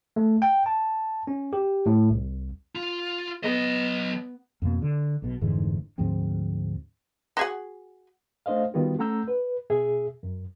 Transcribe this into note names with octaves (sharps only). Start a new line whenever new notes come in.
A3
G5
A5
C#4
G4
A2
C2
F4
F#3 B3 D#5
F2 B2 A#3
D3
B1 B2
F1 G#2 D3 E3
D2 G#2 F3 C4
F#4 G#4 F#5
A3 D4 C5 D#5 F5
D#3 G3 B3 F4 F#4
A3 C#4 F#5 A#5 E6 G6
B4
B2 G#4 E5
F#2